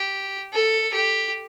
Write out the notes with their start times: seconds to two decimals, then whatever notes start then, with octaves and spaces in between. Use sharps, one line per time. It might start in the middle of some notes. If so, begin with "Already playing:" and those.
Already playing: G4
0.54 A4
0.94 G4